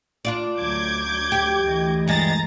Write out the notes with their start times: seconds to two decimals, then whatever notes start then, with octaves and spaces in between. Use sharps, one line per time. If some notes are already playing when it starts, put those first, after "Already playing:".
0.25 D4 F4 D5
0.58 D2 F#3 D6 G6 G#6
1.32 G4
1.64 D2 E3 D#5
2.07 G2 G#3 A#5 A6 A#6